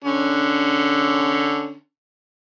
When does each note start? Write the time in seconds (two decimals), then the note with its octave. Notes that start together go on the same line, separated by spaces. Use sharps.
0.04 D3 C#4